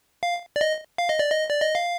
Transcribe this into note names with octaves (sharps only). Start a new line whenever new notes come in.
F5
D5
D#5
F5
D#5
D5
D#5
D5
D#5
F5